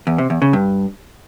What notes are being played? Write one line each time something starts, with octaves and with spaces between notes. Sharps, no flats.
E2
C3
E2
C#3
G2